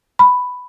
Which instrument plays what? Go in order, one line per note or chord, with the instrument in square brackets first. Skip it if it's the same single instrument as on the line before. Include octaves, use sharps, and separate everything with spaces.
[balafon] B5